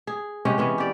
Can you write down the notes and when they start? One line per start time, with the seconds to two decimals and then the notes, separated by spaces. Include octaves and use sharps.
0.07 G#4
0.45 C3 G#3 C#4 G4
0.58 E3 B3 C#4
0.78 G4 D5